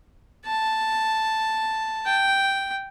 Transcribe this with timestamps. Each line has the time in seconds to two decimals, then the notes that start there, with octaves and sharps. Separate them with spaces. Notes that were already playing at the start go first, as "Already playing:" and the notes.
0.46 A5
2.05 G5